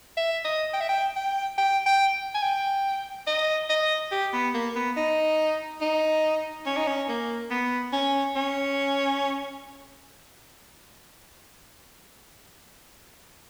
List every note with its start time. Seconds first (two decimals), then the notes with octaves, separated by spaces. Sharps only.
0.17 E5
0.45 D#5
0.74 G5
0.81 E5
0.89 G5
1.16 G5
1.58 G5
1.86 G5
2.35 G#5
2.43 G5
3.27 D#5
3.70 D#5
4.12 G4
4.33 B3
4.54 A#3
4.76 B3
4.97 D#4
5.81 D#4
6.66 C#4
6.77 D#4
6.88 C#4
7.09 A#3
7.51 B3
7.93 C#4
8.36 C#4